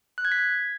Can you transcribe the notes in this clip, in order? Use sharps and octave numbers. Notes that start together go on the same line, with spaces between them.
F#6
G#6
B6
G#6